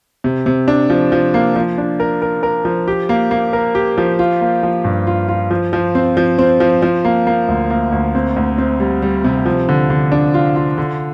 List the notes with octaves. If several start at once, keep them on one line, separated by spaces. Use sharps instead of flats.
C3
C3
D4
F3
F3
A#3
F3
D4
A#4
A#4
A#4
F3
G4
A#3
A#3
A#4
G4
F3
F4
A#3
F3
G2
F4
F4
F3
F3
C4
F3
C4
F3
F3
A#3
A#3
D2
A#3
D2
C4
D2
C4
G3
G3
C3
F3
D3
D3
D4
F4
F4
D3